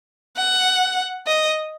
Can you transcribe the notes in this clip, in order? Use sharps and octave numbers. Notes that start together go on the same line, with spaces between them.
F#5
D#5